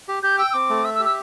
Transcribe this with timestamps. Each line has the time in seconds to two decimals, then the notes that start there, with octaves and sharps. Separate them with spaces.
0.08 G4
0.23 G4 G6
0.38 G5 E6
0.50 E6
0.53 C4 D6
0.70 A3
0.84 E5 E6
0.94 E6
1.00 G4
1.05 E6